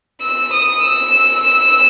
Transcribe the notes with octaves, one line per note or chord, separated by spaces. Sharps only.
E6
D#6
E6